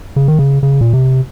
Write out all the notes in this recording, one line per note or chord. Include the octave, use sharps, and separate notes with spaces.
C#3
D#3
C#3
C#3
A#2
C3